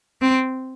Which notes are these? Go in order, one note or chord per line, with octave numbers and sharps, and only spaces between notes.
C4